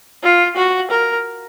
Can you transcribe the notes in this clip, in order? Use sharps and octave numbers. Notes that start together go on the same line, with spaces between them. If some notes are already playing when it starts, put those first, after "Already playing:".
F4
F#4
A#4